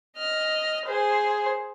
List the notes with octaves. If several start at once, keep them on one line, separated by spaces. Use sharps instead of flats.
D#5 F6
G#4 C5